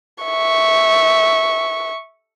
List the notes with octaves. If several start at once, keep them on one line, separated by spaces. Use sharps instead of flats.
E5 C#6